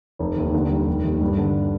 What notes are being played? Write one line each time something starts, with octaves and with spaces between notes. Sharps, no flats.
F1
D#2
D3
G3
F1
D#2
G2
D3